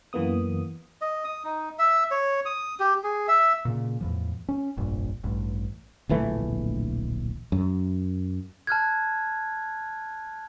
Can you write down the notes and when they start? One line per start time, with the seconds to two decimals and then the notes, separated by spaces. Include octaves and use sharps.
0.13 F#2 E3 A#3 B3 D#6
1.01 D#5
1.24 D#6
1.44 D#4
1.79 E5
2.11 C#5
2.46 D#6
2.80 G4
3.04 G#4
3.28 E5
3.65 A#2 C#3
4.01 E2 A2 F3
4.49 C#4
4.77 F1 A#1 G2
5.24 A1 G2
6.09 D1 A#1 E3 A3
7.52 F#2
8.67 A5 F6 F#6 G#6